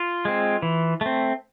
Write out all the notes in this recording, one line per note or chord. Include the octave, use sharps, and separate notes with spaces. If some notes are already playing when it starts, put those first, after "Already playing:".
Already playing: F4
G#3 C4
E3
A3 C4